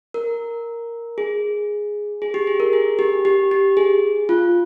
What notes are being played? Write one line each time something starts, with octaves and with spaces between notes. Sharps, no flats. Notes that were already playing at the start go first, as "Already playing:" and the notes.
A#4
G#4
G#4
G4
G#4
A#4
G#4
G4
G4
G4
G#4
F4